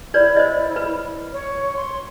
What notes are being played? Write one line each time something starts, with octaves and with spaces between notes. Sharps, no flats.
E4 B4 C#5 D5
C5 D#5
B4
C#5
C6